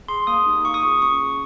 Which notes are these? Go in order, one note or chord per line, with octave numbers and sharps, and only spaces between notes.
G#4 C6
A#3 D#6
D#4 G4
A#3 C#6
D#6
F4 G#4 C#6
C#4 C#6
G#4